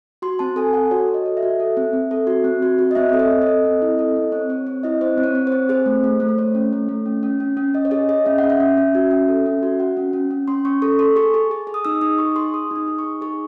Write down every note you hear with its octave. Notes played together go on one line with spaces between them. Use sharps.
F#4 C6
C4 A5
A4 G#5
A4 F#5
F#4 C#5
F#4
D#5
A4
E5
F#4
A4
C4
C4
A4
F#4
C4
F#4
F#4
D#5
C4 E5
A4 C#5
D#5
C4
D#5
A4
C4
E4
A4
C4
C4 C#5
C4 C#5
C4
E4 D#5
C4 C5
C4
C#5
C4
C4 C5
G#4 C5
A3
A3
A3
C5
A3 C#5
C#4
A3
A3
C#4
C#4
C#4
C#4
C#4 D#5
C#5
G#4 D#5
G#4 D#5
C#4 E5
C#4 F#5
E5
C#4
C#4
F#4
C#4
A4
C#4
F#4
F#4 F#5
C#4
C#4
C#4
C#4 C6
C#4 C#6
A4 C#6
A4 C6
G#4 C#6
G#4
G#4
G#4
D#6
D#4 E6
D#4 D#6
G#4 C#6
G#4 C6
G#4 D#6
D#4 D#6
G#4
C#6
D#4
G#4 C#6